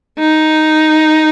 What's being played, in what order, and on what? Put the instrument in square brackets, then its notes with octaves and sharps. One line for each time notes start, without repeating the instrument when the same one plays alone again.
[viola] D#4